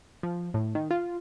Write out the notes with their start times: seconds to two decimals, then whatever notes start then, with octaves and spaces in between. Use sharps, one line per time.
0.23 F3
0.54 A2
0.75 D#3
0.91 F4